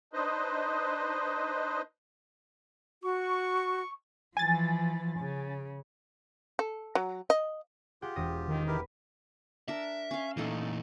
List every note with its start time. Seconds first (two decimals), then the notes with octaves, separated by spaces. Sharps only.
0.13 D4 D#4 B4 C5 D#5
3.03 F#4 C#6
4.37 E3 F3 G#5 A6
5.19 C#3
6.59 A4
6.95 F#3
7.30 D#5
8.02 F4 G4 G#4 F#5 G5
8.16 E1 D#6 A#6
8.48 D#3
8.67 E4 G4 A#4 B4
9.68 D4 A#4 E5
10.11 C#4 F5
10.37 A#2 E3 A3 D#4 A4